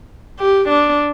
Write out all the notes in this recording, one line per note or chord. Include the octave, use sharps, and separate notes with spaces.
G4
D4